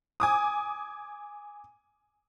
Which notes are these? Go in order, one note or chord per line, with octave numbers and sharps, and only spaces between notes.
G#5 D6 D#6